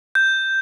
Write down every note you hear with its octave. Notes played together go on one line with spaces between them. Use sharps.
G6